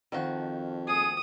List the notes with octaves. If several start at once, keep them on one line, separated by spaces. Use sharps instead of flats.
F2 D#3 F3 F#4
G#4 D#6